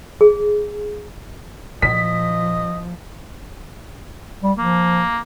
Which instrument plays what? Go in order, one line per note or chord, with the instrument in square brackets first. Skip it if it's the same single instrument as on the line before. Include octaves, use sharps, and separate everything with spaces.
[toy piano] G#4
[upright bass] A#2 [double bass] F3 [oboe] D#5 [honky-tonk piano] B6
[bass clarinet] G3
[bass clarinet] F3 [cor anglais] A#3